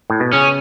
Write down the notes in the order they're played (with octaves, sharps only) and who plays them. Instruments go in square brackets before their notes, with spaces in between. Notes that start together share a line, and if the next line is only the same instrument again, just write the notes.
[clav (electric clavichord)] A2
B2
[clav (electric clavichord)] C#3 [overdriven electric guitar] C#4